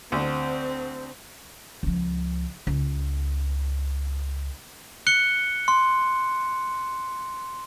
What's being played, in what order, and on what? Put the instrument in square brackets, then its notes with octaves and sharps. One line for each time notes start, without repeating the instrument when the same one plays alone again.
[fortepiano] D2 [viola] C4
[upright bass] C#2 F3
C#2
[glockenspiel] F#6 C#7 G7
C6